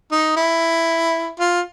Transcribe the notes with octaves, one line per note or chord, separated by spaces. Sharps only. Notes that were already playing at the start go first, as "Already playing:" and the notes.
D#4
E4
F4